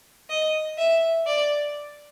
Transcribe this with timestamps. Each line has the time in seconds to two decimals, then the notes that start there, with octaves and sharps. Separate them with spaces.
0.30 D#5
0.78 E5
1.27 D5